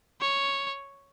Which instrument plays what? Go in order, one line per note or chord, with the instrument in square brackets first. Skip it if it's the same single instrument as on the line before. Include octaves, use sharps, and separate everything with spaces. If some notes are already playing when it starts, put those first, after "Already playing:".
[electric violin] C#5